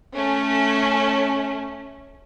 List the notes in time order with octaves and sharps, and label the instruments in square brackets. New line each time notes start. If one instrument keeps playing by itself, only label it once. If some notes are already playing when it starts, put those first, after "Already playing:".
[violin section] A3 C#4